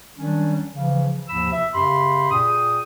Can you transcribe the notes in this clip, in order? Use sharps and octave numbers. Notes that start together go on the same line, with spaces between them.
D#3 F#3 G3 C#4 D4
C#3 E3 F3
D#2 G#2 C3 F3 B5 E6
E5
F#2 C#3 G4 B5 C6
A#2 G#4 G5 D#6